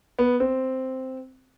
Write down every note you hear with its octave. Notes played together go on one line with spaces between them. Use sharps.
B3
C4